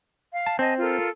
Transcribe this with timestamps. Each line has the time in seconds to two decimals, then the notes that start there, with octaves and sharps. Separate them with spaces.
0.32 F5
0.46 A5
0.59 C4 D#5 G#5 A5
0.79 F4 A4 A#4